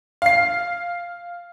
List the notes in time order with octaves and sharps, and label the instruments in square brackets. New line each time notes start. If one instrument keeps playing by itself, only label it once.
[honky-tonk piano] F5 C7